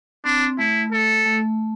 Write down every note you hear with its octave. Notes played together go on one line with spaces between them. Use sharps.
C4 D4
A3 E4
A4
A3